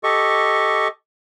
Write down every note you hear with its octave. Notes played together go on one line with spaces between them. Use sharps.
G4 A4 D#5 C#6